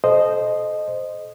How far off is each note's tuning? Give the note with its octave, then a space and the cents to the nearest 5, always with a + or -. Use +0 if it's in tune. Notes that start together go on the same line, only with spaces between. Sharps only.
A4 -30 C5 +0 D#5 -10